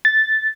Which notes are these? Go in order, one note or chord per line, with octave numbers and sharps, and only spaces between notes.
A6